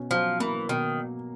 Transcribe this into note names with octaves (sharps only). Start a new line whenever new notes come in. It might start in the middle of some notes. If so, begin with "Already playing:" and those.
Already playing: B2 C#4
F3 F#3
E3 A#3
B2 D#3